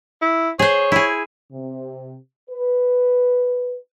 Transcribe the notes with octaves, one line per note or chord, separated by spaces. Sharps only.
E4
G#4 C5 C#5
E4 G#4
C3
B4